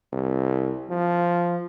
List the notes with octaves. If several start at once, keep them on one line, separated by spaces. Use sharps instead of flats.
C2
F3